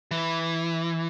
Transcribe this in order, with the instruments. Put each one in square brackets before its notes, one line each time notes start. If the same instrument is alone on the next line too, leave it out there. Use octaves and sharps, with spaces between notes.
[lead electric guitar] E3